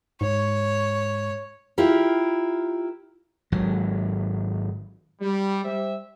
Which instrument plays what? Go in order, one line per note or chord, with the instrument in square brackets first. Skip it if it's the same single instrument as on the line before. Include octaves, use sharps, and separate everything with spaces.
[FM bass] G#2 [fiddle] C#5
[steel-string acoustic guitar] E4 F4 G4 A#4
[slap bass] G#1 F#3
[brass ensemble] G3
G3 G4 C5 E5